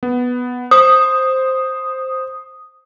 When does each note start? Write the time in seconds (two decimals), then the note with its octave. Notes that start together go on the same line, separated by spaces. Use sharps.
0.03 B3
0.71 C5 D#6